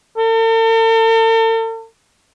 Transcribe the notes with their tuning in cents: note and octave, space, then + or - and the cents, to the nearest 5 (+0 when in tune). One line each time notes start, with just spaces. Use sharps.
A4 +45